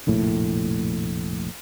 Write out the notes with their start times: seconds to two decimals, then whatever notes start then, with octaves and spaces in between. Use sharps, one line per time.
0.07 F1 A#1 A2